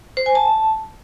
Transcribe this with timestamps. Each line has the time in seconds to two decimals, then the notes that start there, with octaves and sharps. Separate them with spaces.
0.17 C5
0.26 G#5
0.35 A5